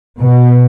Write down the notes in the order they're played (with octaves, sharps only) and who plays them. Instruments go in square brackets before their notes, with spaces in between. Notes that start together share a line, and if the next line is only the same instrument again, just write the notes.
[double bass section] B2